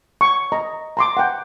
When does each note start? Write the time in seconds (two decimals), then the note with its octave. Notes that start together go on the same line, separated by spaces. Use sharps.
0.21 C#6
0.52 D#5 A#5
0.97 A#5 C6 D6
1.17 F#5 G5